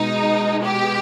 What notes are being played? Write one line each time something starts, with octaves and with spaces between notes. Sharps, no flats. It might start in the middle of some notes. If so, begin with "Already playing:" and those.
Already playing: B2 G#3 D#4
G4